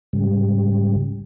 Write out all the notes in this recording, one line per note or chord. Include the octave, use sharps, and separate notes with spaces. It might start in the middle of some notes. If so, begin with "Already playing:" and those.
G#2 C#3 G3